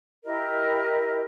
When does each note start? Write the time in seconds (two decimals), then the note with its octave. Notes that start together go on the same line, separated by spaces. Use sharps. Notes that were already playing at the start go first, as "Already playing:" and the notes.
0.24 E4 G4 A#4 D#5